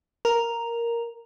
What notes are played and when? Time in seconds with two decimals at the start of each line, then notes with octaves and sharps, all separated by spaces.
0.25 A#4